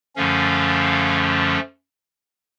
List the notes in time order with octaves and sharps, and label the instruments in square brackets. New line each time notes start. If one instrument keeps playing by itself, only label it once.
[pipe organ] F#2 D3 F3 A3 C#4 F5